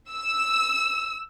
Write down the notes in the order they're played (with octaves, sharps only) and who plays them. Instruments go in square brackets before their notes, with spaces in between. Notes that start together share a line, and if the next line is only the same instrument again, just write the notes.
[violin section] E6